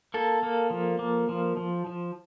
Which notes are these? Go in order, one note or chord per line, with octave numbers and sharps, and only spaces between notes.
A#3 A4
A#3
F3
A#3
F3
F3
F3